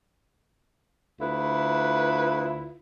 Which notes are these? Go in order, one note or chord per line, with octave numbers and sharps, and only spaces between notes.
D2 E4 F4 B4